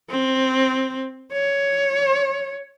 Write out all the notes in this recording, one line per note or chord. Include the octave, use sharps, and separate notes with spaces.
C4
C#5